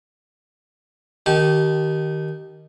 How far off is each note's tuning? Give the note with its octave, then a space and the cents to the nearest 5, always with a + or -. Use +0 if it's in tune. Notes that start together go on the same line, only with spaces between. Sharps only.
D#3 -5 G4 -25 A5 -30